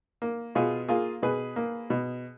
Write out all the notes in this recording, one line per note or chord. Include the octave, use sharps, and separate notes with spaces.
A#3
B2 F4 G#4
A#3 F4 G#4
B2 G#4 B4
A#3
B2